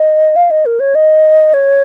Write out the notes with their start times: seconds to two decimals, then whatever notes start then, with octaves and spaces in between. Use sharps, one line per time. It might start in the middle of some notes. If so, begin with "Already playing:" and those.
Already playing: D#5
0.36 F5
0.51 D#5
0.66 A#4
0.80 C#5
0.95 D#5
1.54 C#5